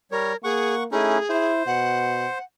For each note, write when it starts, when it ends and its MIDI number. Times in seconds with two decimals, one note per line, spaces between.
0.11 0.33 55
0.11 0.36 70
0.11 0.33 73
0.44 0.86 58
0.44 0.74 68
0.44 0.83 78
0.44 0.83 85
0.92 1.18 57
0.92 1.18 61
0.92 1.18 63
0.92 1.18 64
0.92 1.52 68
1.29 1.63 64
1.29 2.38 72
1.67 2.26 47
1.67 2.43 78